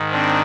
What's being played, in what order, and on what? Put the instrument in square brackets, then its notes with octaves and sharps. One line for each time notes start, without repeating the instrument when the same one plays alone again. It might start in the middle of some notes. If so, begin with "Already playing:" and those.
Already playing: [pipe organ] G#2 D#3
C4 D4